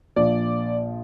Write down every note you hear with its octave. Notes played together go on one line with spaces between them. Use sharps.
A#1 A#2 F3 D5